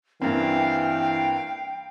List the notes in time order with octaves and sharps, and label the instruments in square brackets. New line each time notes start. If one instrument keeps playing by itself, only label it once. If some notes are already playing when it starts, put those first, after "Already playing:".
[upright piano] G2 A#3 C4 [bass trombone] E3 [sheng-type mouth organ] F5 [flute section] G5